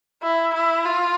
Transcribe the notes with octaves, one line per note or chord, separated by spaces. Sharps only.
E4
E4
F4